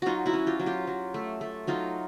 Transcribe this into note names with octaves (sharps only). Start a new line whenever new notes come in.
F#3 D#4 F4 F#4
E4 F#4
C#4
F4 G4
F#3
F4 G4
F#3
A3
A3
F#3 D#4 F4